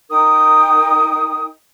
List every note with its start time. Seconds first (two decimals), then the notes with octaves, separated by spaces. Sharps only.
0.10 D#4 A#4 G5 D#6